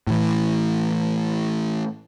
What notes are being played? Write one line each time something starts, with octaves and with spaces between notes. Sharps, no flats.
A2 E3